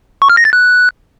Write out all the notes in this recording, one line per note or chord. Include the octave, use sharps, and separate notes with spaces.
C#6
F6
A#6
A6
F#6